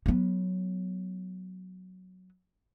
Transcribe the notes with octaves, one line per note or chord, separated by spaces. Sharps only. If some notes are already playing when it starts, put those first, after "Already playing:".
F#3 B3